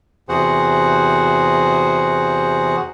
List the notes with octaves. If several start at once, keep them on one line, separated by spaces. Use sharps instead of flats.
E2 C3 F#4 G#4 C5 F#5